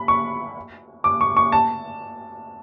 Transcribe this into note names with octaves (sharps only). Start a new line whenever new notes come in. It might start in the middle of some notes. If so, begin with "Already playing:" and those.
Already playing: B5
C#6
D6
C#6
C#6
A5